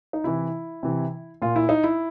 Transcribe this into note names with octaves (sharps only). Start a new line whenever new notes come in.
D#4
C3 E3 E4
C3 E3
A#2 F4
E4
D#4
E4